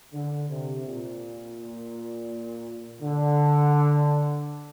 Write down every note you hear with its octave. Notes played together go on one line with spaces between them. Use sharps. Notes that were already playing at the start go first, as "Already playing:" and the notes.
D3
C3
A#2
D3